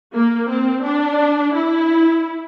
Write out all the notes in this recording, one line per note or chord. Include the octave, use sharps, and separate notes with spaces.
A#3
C4
D4
E4